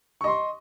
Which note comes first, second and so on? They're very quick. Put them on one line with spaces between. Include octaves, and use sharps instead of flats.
C#6 D#5 C6